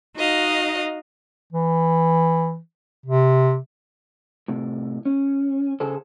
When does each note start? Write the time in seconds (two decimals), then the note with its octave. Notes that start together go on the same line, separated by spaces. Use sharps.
0.16 D#4 F#4 D#5 F5
1.53 E3
3.06 C3
4.48 A2 C3
5.05 C#4
5.80 C#3 G#4 A4 C5